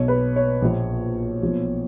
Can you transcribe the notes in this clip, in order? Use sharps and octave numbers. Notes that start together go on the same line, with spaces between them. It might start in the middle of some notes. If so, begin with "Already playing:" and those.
Already playing: B1 B2 C#5
B4
C#5
A#1 A#2 F3
B1 A#2 F3